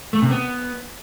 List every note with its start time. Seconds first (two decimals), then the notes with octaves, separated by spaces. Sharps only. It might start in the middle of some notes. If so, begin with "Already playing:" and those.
0.13 A3
0.22 C3
0.31 B3